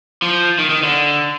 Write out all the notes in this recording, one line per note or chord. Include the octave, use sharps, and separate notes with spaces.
F3
D#3
D#3
D3